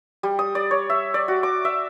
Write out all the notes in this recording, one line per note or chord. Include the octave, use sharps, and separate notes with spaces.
G3
D#6
D5
C#5
E5
D5
F#4
D6
E5